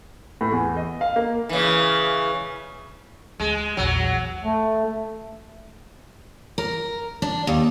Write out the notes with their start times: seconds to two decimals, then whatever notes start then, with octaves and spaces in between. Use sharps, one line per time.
0.41 A2
0.52 E2
0.77 D#5
1.01 F5
1.16 A#3
1.49 C#3 E3
3.40 D2 G#3
3.77 A#1 E2 F#3
4.44 A3
6.58 A#4
7.22 D4
7.47 D#2